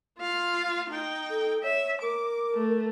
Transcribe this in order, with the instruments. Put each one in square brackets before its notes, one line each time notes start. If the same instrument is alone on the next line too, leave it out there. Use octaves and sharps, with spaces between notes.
[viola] F4 F5
D#4 G5
[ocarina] A4
[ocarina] C#5 [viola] E5
[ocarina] A#4 [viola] D6
[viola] A3